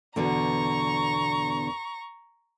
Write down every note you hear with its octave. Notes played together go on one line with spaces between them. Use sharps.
E2 B2 D3 A#5 C#6